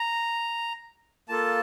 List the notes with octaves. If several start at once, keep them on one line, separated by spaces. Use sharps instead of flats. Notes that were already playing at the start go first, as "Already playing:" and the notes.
Already playing: A#5
A#3 F4 A4 A5